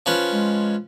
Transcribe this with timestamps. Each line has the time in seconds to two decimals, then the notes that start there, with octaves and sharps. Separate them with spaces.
0.06 F3 C#4 B4
0.33 G#3